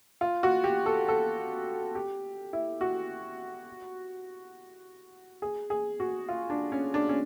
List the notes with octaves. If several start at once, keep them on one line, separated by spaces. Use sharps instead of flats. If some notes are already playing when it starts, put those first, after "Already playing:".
F4
F#4
G4
A4
A4
G4
E4
F#4
G#4
G#4
F#4
F4
D4
C#4
D4
C#4